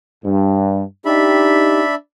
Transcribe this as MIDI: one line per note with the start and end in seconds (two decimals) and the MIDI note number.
0.24 0.82 43
1.05 1.95 62
1.05 1.83 63
1.05 1.83 67
1.05 1.95 76
1.05 1.95 83